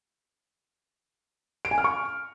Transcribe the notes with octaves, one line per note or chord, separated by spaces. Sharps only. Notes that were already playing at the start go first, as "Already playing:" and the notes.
D7
G#5
F6
C#6